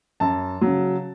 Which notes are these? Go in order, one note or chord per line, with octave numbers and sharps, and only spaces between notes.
F#2 A5
C#3 F#3